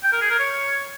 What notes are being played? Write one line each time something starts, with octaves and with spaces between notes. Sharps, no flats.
G5
A#4
G#4
A#4
C#5